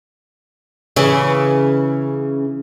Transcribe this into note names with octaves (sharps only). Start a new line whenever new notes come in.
C#3 E3